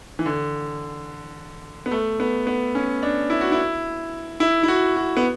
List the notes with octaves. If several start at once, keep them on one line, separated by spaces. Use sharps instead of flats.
E3
D3
B3
A3
B3
B3
C#4
D4
E4
F#4
E4
E4
E4
F#4
F#4
B3